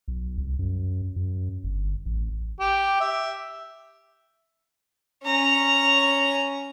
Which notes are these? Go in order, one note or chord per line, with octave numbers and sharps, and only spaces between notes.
B1
C2
F#2
F#2
G1
A1
G4
E5
C#4 A#5